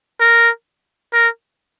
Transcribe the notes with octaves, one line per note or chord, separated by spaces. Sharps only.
A#4
A#4